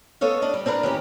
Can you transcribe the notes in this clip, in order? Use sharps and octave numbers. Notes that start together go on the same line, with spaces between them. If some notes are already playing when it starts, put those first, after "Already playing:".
B3 A4 C#5 D#5 F5
D4 D#5
G3
C4 D4 A#4 B4
D#3 C#4 G4